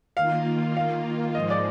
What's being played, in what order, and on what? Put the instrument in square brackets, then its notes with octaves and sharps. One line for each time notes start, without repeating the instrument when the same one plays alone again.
[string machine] D#3 A#3 F4 [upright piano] F5
[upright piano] F5
[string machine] G#2 F3 G#3 [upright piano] D#5
[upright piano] D5